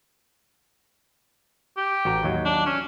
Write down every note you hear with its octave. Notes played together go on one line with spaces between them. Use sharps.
G4
A1 F#4 A#5
D#2 F#3
D4
C#4